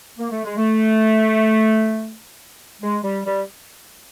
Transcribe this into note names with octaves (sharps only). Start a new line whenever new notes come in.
A#3
A3
G#3
A3
G#3
G3
G3